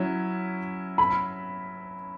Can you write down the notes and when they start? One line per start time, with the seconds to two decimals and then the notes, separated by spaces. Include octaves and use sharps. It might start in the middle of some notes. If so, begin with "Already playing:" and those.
Already playing: F#3 C#4 E4
0.98 B5